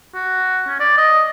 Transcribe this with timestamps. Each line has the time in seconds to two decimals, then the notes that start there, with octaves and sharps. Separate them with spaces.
0.14 F#4
0.67 C#4
0.80 D5
0.97 D#5